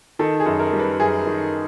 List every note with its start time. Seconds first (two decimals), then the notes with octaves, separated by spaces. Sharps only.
0.19 D#3 A4
0.40 G#4
0.46 F#2
0.59 A#4
0.73 G3
0.80 B4
1.00 F#2 G#4
1.27 D#3